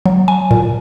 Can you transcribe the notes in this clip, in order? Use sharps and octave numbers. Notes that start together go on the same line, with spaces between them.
F#3
G#5
A#2